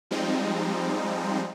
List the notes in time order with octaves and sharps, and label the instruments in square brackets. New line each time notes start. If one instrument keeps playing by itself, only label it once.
[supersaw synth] F3 G3 G#3 C4 D#4